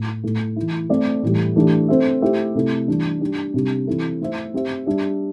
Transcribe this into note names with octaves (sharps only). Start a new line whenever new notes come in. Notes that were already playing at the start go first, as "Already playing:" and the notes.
Already playing: A2
A2 A3 E4
E3 A3 E4
A3 C4 A4 D5
A2 E3 G3
E3 A3 D4 G4
C4 A4 C5 E5
A3 E4 G4 C5 E5
C3 A3 E4 A4
E3 G3 D4
G3 D4 G4
C3 G3 D4
E3 C4 E4 A4
A3 E4 C5 E5
C4 G4 C5 E5
G3 D4 G4 E5